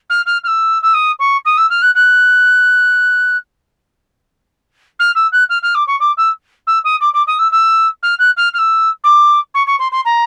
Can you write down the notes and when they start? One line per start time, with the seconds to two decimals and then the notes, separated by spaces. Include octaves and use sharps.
0.10 F6
0.26 F6
0.44 F6
0.47 E6
0.82 E6
0.94 D#6
1.19 C#6
1.45 D#6
1.57 E6
1.70 F6
1.82 F#6
1.95 F#6
4.99 F6
5.15 E6
5.32 F#6
5.49 F6
5.63 F6
5.75 D6
5.87 C#6
6.00 D6
6.17 E6
6.67 E6
6.84 D#6
7.01 D6
7.14 D6
7.27 D#6
7.39 E6
7.52 E6
8.03 F6
8.19 F#6
8.37 F6
8.54 F6
8.58 E6
9.04 D6
9.54 C#6
9.67 C#6
9.79 C6
9.92 C6
10.05 A#5